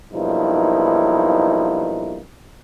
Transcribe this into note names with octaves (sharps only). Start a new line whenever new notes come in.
B1 G2 F3 A#3 D#4 E4